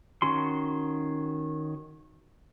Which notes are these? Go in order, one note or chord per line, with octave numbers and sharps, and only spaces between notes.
D#3 C#4 F#4 C6